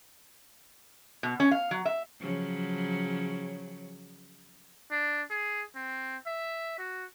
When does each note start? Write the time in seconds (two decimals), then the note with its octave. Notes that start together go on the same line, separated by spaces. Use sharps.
1.23 B2
1.40 C#4
1.51 F5
1.71 F#3
1.85 E5
2.20 C#3 F3 F#3
4.91 D4
5.30 G#4
5.75 C4
6.26 E5
6.79 F#4